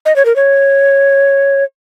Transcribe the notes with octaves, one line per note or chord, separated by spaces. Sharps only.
D#5
C#5
A#4
C#5